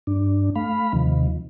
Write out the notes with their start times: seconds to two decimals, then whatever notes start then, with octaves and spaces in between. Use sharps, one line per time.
0.07 G2 D4
0.55 A3 F5 B5
0.93 D#2 C3 D#3 F3